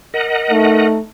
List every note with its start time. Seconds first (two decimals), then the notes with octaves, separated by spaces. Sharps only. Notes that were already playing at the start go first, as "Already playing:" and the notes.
0.14 A#4 D#5 F#5
0.51 A3 D#4